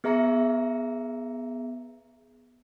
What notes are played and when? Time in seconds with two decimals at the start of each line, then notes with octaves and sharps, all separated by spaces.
0.04 B3 G#4 E5 A#5 A#6 C#7